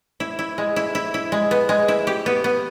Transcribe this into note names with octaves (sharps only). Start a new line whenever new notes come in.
E4
E4
G#3
E4
E4
E4
G#3
B3
G#3
E4
G4
B3
B3